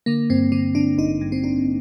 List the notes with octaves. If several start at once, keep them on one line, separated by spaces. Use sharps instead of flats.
D3 A#3
G2 C4
D3 C4
D3 D4
A1 D#4
G2
C4
A1 D4